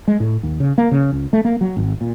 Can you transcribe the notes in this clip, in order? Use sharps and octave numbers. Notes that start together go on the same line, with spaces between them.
G#3
A2
D#2
C#3
A#3
C#3
C#2
A3
A#3
F#3
G#1
A#2